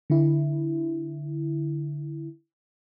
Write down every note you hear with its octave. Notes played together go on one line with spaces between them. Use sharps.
D3 E4